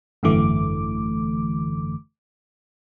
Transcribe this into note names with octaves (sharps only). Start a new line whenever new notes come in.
G#1 F#2 D3 E3 A3 D6